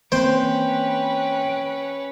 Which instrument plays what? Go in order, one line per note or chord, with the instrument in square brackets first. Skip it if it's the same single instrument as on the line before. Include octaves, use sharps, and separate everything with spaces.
[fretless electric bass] E3 A#3 C4 [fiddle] C#4 B4 [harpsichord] C5 [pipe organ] G5